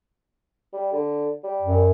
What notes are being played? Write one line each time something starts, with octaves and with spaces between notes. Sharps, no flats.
G3
D3
G3
F#2